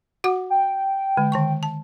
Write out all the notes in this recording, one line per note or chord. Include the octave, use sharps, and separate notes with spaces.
F#4 F#5 D6
G5
D3 G#3
D#3 A5 C#6
A5